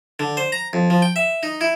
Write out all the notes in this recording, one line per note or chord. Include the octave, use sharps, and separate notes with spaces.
D3
C5
A#5
F2
F3
G5
E5
D#4
E4